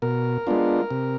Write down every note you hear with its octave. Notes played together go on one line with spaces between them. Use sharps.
B2 A#4
G#3 B3 D4 F4
C3